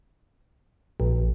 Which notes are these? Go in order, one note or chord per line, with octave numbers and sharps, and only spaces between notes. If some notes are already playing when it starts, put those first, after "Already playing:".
A#1